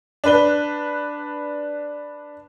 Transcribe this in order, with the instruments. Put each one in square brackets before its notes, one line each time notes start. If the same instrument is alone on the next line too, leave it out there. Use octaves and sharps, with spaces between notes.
[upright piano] D4 B4 G7